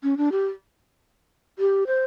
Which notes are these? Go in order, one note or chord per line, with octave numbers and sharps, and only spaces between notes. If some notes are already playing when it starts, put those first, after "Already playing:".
C#4
D4
G4
G4
C5